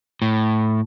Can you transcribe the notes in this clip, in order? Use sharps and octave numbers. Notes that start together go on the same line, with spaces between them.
A2